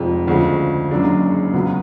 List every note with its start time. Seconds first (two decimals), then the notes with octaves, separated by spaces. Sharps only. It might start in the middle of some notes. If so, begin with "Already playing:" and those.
Already playing: F1 F2 F3 G#3
0.28 D2 C#3 F3 G#3
0.91 F#1 F#2 C#3 G#3 D4
1.54 C#2 C#3 F#3 B3